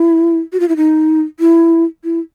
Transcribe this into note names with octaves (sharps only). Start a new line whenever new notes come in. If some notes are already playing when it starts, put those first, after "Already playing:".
Already playing: E4
F#4
F4
E4
D#4
E4
E4